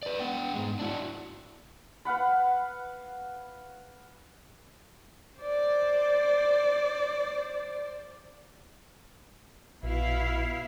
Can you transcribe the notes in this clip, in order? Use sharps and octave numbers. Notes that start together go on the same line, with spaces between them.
B4 D5
B3 F#5 G5
G#2 G#3
D4 E4 F#4
B4 F5 F#5 B5
C5 D5
A#1 B2 E4 F5